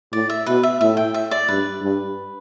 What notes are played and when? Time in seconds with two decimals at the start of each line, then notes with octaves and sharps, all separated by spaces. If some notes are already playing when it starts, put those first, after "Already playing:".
0.13 A2 D5
0.30 E5
0.46 B2 B4
0.63 E5
0.81 A2 E5
0.97 G5
1.14 E5
1.31 D5
1.48 G2 B4
1.82 G2